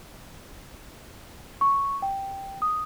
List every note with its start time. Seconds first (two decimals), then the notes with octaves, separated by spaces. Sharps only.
1.61 C#6
2.02 G5
2.62 D#6